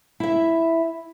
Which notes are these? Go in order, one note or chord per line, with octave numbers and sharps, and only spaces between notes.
E4 E5